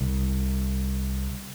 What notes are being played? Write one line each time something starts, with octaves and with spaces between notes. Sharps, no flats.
C2